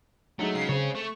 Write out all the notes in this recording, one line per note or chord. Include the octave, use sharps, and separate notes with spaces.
F#3 G#3 A3 D#4
C#3 C7
C#3 G#3 C4 G#4 C#5
A3 C#6